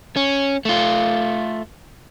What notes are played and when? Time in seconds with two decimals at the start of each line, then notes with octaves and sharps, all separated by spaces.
0.16 C#4
0.65 A3 F4